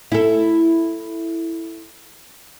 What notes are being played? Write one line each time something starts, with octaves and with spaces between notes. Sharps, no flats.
E4 A4